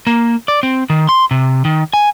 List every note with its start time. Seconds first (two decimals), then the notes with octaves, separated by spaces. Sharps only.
0.07 A#3
0.48 D5
0.63 C4
0.90 D#3
1.09 C6
1.31 C3
1.65 D#3
1.94 G#5